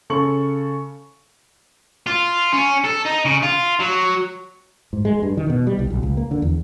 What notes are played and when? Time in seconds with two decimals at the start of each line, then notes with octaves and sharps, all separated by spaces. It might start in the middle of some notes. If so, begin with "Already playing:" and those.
0.10 C#3 A4 C#6 C#7 F#7
2.07 F4
2.52 C#4
2.84 A4
3.05 D#4
3.25 C#3
3.43 F4
3.80 F#3
4.93 G#2
5.05 G#3
5.22 G2
5.37 D#3
5.50 B2
5.67 G3
5.79 C2
5.90 B1
6.03 C#2
6.17 A#3
6.31 D3
6.42 E2